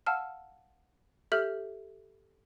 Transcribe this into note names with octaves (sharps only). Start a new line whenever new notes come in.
F5 F#5 A5 E6 F6
G4 A4 E5 F6 G6 F#7